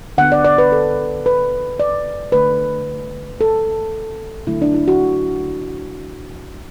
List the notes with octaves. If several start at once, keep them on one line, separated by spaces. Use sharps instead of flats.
D3 B3 F#5
D5
D5
B4
A4
B4
D5
D3 A3 B4
A4
D3 F#3 A3 E4
D4
E4
F#4